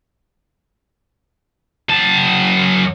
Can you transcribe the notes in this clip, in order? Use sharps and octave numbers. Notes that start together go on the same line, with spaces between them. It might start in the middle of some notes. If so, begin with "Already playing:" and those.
F#2 A5